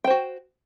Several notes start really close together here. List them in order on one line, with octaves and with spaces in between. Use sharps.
G5 C5 F#4